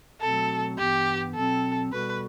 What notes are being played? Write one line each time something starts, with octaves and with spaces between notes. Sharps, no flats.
B2 F#3 A3 C4 F#4 A4
G2 E3 B3 G4
B2 F#3 C4 A4
B2 G3 B3 F#4 A4 B4